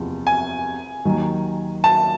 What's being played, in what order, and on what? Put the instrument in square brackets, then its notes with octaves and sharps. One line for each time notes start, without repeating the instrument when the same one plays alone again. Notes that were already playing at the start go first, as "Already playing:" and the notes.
Already playing: [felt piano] F#1 E2 C3 F3
[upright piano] G#5
[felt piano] D#2 D#3 F#3
[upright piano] A5